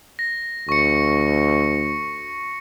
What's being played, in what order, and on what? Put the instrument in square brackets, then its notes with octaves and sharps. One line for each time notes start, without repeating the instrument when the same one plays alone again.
[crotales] A#6
[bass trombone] D2 [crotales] C#6 C#7